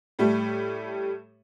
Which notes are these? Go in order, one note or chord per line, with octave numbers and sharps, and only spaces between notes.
A2 G3 A3